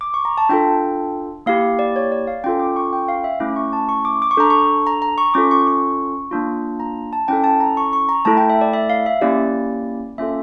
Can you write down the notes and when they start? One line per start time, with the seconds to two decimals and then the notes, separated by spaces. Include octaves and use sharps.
0.01 D6
0.14 C#6
0.25 A#5
0.38 A5
0.49 D4 F4 A4 G5
1.46 A#3 E4 G4 F5
1.79 D5
1.96 C#5
2.12 D5
2.27 F5
2.44 C#4 F4 A4 G5
2.60 D6
2.76 C#6
2.93 G5
3.08 F5
3.24 E5
3.40 A3 C#4 E4 D6
3.56 C#6
3.73 A5
3.89 C#6
4.05 D6
4.22 D6
4.31 C#6
4.37 D4 A4 A#5
4.50 C#6
4.87 A#5
5.02 A#5
5.18 C#6
5.34 C#4 F4 A4 D6
5.51 C#6
5.67 C#6
6.31 A#3 D4 F4
6.80 A#5
7.13 A5
7.28 C#4 E4 A4 G5
7.44 A5
7.60 A#5
7.77 C#6
7.93 C#6
8.09 A#5
8.25 A3 E4 A4 A5
8.37 G5
8.50 E5
8.61 D5
8.73 E5
8.90 F5
9.06 E5
9.21 A#3 C#4 E4 G4 D5
10.18 A#3 C#4 F4 A4 E5